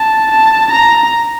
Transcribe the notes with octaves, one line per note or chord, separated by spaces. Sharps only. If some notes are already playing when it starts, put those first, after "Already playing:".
Already playing: A5
A5
A#5